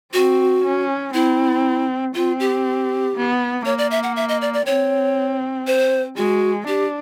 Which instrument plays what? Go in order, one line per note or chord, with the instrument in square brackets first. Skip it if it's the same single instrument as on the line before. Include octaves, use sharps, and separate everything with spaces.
[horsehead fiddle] C4 [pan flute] F#4
[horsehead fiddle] C#4
[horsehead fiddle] C4 [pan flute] E4
[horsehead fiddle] C4 [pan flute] F4
[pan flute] G4
[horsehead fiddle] B3
[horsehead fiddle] A#3 [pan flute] C#5
[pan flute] D5
E5
F#5
E5
D#5
D5
D5
[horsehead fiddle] C4 [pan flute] C#5
[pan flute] C5
[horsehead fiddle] G#3 [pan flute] F#4
[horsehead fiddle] D4 [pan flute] G4